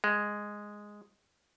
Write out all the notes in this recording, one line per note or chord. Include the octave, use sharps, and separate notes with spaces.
G#3